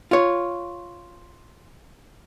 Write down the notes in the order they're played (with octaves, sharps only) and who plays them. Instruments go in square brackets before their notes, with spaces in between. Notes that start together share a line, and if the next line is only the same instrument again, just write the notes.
[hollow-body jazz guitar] F4 C#5